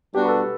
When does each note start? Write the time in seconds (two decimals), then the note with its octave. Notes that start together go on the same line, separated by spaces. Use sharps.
0.14 G3 B3 D4 F#4 G4
0.25 B4
0.28 A4